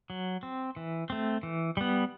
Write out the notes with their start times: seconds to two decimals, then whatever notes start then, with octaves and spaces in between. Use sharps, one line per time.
0.10 F#3
0.43 C4
0.76 E3
1.10 A3 C4
1.43 E3
1.77 G3 B3